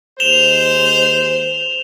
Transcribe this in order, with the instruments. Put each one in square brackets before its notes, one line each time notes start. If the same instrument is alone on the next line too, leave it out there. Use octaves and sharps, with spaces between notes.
[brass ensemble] D#2 G#3 C5 [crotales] E7 F7 G7